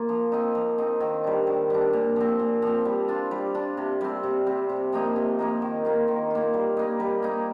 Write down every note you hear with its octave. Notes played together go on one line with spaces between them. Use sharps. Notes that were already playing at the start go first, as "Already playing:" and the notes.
Already playing: A#3 F4
F3
C4 D#4
F3
C4 D#4
D#3
G3 D4
D#3
G3 D4
A#2
F3 C4
A#2
F3 C4
G3
D4 F4
G3
D4 F4
C3
G3 C4
C3
G3 C4
C3
F3 A#3 D#4
C3
F3 A#3 D#4
D#3
A#3 F4
D#3
A#3 F4
G3
A#3 D#4
G3
A#3 D#4